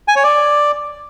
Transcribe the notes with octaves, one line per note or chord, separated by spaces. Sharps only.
G#5
C#5
D5